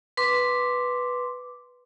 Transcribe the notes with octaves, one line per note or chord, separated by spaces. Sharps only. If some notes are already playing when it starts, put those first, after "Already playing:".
B4 C6 D6